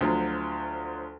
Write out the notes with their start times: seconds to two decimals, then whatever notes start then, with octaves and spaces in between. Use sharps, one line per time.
0.01 D2 F3 F#3